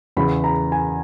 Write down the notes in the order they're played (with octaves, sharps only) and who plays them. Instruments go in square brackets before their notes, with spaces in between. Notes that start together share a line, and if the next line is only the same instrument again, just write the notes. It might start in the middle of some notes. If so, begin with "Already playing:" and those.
[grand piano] E2 C#3 E3 B5
A#5
G#5